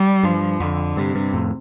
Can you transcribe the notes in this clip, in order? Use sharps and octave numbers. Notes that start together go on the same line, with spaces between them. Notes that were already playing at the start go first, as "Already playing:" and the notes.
Already playing: G3
G2 F3
F2 D3
G2 C3
G2
F2 A2